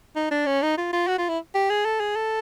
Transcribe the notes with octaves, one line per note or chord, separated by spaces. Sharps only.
D#4
D4
C#4
D#4
F4
F4
F#4
F4
E4
G4
G#4
A4
G#4
A4